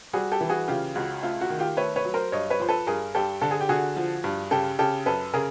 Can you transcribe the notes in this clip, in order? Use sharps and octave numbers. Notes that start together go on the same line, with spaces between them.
G3 F#4 G#4
G4 A4
E3
F#4 G#4
C#3 F4 G4
C#2 F#4
A3 F4
F#4
D#3
F4 G4
A3 B4 C#5
B4 C#5
F#3
A#4 C5
G2 C#5 D#5
B4 C#5
F3 C5
A4 B4
G2 G#4 A#4
G2 G4 A4
D3 A4
G#4
G4
D3 F#4 G#4
F3
G2
C#3 G4 A4
C#3 G4 A4
F#2 A4 B4
C#3 G#4 A#4